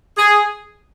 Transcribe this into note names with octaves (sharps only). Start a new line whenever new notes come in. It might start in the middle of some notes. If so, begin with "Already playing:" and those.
G#4